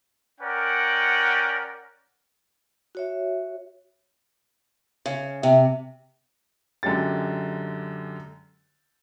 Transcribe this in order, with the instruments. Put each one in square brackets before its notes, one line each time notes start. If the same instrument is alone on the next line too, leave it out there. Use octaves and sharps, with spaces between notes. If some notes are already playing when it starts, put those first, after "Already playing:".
[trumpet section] C#4 A#4 D5 F#5 G5
[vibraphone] F#4 C#5 E5
[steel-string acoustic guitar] C#3
C3
[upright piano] F#2 D3 G#3 G4 A6